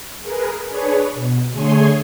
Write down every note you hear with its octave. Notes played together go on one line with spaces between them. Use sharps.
G#4 A#4 B4
D4 G#4 B4 C#5
B2
D3 A3 G#4 C#5 G#5 C6